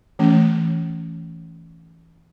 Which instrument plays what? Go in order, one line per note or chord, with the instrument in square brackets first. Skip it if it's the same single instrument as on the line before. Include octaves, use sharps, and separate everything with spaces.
[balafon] E3 A3 C#4